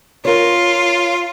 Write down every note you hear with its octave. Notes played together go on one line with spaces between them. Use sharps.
F4 A#4 C#5